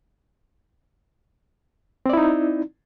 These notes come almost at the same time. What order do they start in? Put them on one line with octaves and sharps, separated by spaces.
C4 D5 E4 D#4